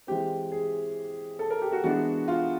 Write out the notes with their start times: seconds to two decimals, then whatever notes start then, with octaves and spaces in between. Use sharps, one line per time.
0.07 E3 G#3 C4 G4
0.52 G#4
1.39 A4
1.50 A#4
1.62 G4
1.72 F#4
1.84 E3 G#3 B3 D4 F#4
2.28 F4